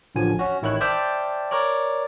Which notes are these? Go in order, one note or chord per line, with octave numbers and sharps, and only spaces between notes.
A1 D2 D3 F3 G#5
C#4 F#4
A1 D#3 E4 C#5 F#6
C5 D5 E5 G5 A5 F6
A#4 C#5 D5